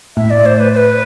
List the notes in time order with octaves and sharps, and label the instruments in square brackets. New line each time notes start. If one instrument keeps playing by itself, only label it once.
[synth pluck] A2 [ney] E5
[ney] D5
C5
B4
C5
B4